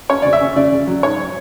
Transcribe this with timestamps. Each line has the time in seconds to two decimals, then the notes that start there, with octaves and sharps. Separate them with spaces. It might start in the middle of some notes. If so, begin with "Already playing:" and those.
0.09 C#4 C#5
0.22 C#3 D5
0.33 E5
0.41 C#4
0.56 C#3 D5
0.72 C#3
0.87 F#3
1.03 G#2 C#5